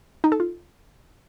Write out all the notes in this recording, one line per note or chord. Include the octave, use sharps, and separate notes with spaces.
D#4
A4
F4